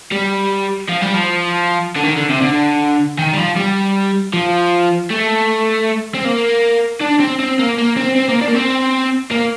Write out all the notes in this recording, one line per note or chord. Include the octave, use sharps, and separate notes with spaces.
G3
F3
G3
F3
D3
D#3
D3
C3
D3
D#3
G3
F3
G3
F3
A3
C4
A#3
D4
C4
C4
A#3
A#3
C4
C4
A#3
D4
A#3
C4
A#3